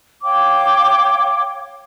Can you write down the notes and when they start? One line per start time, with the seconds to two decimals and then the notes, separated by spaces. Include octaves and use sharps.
0.23 C#5 F5 G5 D6